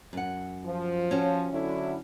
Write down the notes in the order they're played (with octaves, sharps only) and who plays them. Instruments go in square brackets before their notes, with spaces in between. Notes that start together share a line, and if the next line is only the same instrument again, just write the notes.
[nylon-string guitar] F#2 F#5
[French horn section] F3
[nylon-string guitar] C#4 F#4
[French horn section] D3 F#3 E4